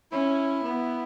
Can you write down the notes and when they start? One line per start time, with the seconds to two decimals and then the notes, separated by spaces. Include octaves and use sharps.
0.12 C#4 E4
0.63 B3